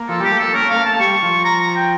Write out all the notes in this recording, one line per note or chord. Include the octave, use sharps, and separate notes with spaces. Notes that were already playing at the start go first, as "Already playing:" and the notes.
Already playing: A#3
F3 A4
G3 G4
A3
A#3 A4
C#4 A#4
C#4
A3 F5
A#3
A3 A5
G3 C#6
F3
A#5
A#5
G5